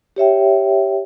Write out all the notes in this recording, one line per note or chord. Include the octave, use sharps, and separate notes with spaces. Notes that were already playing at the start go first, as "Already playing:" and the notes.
G4 C#5 E5 G5